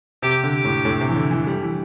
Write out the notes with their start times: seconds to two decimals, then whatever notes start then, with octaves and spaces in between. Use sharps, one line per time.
0.22 C3 G4
0.44 D3
0.53 G4
0.64 A2
0.85 A2
1.01 C3
1.09 E3
1.16 D3
1.31 E3
1.47 G3
1.63 E3